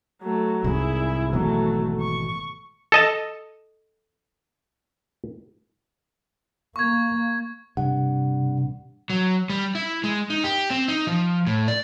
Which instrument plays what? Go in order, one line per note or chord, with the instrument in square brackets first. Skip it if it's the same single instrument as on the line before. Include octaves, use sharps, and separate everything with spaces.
[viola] F#3 A3
[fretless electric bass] C2 G#2 [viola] E4 G#4
[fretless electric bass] G#1 B2 E3 [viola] F#3 A3
[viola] C#6
[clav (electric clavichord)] A4 D#5 A5
[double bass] A#3 [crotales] C#6 G#6
[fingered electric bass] G2 [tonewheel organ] C3 [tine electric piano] F#5
[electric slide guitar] F#3
G3
E4
G#3
D#4
G4
C4
D#4
F3
A2
D5